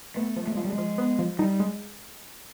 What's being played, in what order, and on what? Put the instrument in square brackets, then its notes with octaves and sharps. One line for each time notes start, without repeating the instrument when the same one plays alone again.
[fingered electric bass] A3 [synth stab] B3
[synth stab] F3
[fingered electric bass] A3
[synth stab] F3 [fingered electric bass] G#3
[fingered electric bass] G3
G#3
[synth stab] F3
B3
F3
[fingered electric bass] G3 [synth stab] D#4
[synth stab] G#3